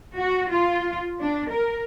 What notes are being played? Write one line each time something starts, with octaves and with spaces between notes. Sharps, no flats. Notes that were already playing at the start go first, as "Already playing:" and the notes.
F#4
F4
D4
A#4